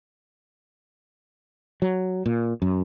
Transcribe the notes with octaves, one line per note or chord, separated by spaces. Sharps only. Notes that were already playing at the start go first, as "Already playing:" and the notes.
F#3
A#2
F#2